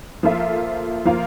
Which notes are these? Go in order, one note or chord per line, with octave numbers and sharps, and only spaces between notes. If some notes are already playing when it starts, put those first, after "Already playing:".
F3 A#3 F4 A4 E5
F3 A#3 F4 A#4 F5